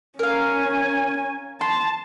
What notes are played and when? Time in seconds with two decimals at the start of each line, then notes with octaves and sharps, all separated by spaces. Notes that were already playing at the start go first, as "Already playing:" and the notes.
0.19 C#4 A#4 F5 G#5
1.61 A5 C6